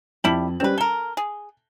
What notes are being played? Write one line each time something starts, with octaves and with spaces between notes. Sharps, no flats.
F2 G3 E4 G4 A5 F#7
G3 C4 C#4 B4
A4 A#4 G7
G#4